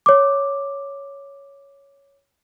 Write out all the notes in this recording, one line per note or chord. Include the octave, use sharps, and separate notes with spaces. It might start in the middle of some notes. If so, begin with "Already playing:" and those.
C#5 D6